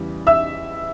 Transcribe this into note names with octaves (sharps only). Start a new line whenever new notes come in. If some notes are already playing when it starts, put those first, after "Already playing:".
Already playing: E2 C#3 G3
E5 E6